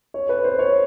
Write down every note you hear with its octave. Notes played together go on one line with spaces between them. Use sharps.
C#5
B4
C5
C#5